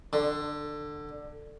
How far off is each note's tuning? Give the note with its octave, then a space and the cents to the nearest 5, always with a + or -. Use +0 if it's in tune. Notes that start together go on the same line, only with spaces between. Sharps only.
D3 +15